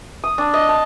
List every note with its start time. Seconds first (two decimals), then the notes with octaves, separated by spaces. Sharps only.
0.24 D#6
0.38 D4
0.54 D#5
0.69 A5